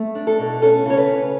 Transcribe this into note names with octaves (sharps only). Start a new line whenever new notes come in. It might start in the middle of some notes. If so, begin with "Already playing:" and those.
Already playing: A3
D4
A4
B2
C#4 A4
C#3
C#5
B4
C#3